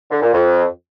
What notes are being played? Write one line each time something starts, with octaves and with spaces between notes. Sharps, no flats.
D3
A#2
F2